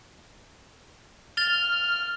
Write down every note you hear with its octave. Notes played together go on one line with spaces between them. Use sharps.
F6 A6 F7 G7